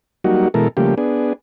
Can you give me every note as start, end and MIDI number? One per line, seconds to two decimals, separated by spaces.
0.24 0.48 54
0.24 0.48 55
0.24 0.48 58
0.24 0.48 63
0.24 0.48 66
0.54 0.68 47
0.54 0.68 52
0.54 0.68 56
0.54 0.68 69
0.54 0.68 70
0.77 0.95 49
0.77 0.95 53
0.77 0.95 55
0.77 0.95 57
0.77 0.95 58
0.77 0.95 67
0.98 1.33 59
0.98 1.33 62
0.98 1.33 68